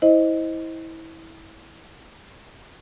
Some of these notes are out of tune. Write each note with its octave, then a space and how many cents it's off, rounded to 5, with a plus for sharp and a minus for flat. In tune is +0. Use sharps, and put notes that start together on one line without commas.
E4 -20 C5 +0 D#5 +0